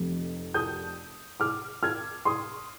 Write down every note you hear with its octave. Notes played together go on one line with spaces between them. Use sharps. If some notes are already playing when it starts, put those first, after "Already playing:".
Already playing: F1 F2 C3
D#6 G6
D6 F6
F6 G#6
C6 D#6